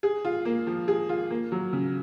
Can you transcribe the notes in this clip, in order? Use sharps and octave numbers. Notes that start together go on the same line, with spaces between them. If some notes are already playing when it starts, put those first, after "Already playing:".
G#4
F4
A#3
F3
G#4
F4
A#3
F#3
C#3